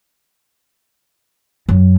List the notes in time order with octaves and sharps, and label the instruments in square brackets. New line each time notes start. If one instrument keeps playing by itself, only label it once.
[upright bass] F#2